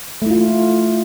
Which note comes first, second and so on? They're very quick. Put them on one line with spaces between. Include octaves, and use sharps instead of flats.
A3 E4 F4